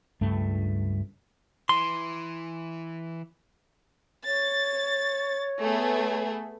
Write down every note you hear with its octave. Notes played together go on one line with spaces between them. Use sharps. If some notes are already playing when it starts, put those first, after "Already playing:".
C#2 G2 A3
E3 C6
C#5 A6
A3 B3 G#4